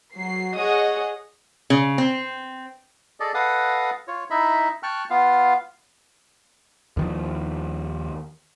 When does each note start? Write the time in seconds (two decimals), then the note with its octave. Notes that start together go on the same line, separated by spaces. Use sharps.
0.14 F#3 C7
0.56 G#4 C#5 D#5 F#5 D#6
1.70 C#3
1.98 C4
3.20 G#4 A4 D5 D#5
3.34 A4 B4 D#5 F5 F#5 D#6
4.08 F4 C#5
4.30 D#4 E4 D#5 E5 B5
4.83 G5 A5 C#6 F6 F#6
5.10 B3 F4 F5
6.97 D#2 D#3 F3